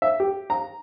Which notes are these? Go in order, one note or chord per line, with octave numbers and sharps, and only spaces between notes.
E5
G4
A#5